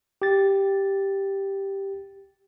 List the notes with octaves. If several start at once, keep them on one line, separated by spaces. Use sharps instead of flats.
G4 A6